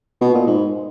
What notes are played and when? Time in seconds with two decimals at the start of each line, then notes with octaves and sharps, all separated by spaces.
0.21 B2
0.34 A#2
0.47 G#2